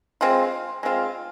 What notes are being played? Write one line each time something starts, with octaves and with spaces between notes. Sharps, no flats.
G#3 C4 F4
G#3 C4 F4